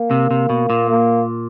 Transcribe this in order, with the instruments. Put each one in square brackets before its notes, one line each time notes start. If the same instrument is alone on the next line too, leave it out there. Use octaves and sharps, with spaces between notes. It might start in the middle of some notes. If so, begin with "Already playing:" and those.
Already playing: [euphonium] A#3
[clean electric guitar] C3
C3
B2
A#2
[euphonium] A#3